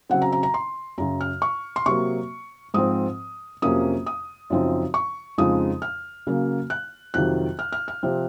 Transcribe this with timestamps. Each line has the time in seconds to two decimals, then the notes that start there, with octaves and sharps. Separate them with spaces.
0.09 C#3 F#3 C4 F#5
0.22 A#5
0.32 A#5
0.43 A#5
0.54 C6
0.98 F#2 C#3 F#3 A#5
1.21 F6
1.42 C#6
1.76 C6
1.86 C3 F#3 A#3 C#6
2.74 G#2 F3 C4 D#6
3.62 F2 C3 F#3 A#3 C#4 D#6
4.07 D#6
4.50 F#2 C#3 F3 C4 D#4
4.94 C#6
5.38 F2 C#3 F3 G#3 D#4 D#6
5.82 F6
6.27 C#3 F#3 A#3
6.70 F#6
7.14 F2 C3 D#3 F#3 F#6
7.59 F6
7.72 F6
7.88 F6
8.03 C3 F3 C4